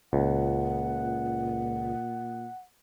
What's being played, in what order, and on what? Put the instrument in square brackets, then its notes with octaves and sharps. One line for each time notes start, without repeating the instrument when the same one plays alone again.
[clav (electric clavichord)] C#2 [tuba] A#2 [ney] F#5